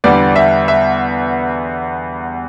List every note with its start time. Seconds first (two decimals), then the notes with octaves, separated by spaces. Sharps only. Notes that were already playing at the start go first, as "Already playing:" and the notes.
0.04 E2 D3 G3 B3 D5
0.36 E5
0.68 E5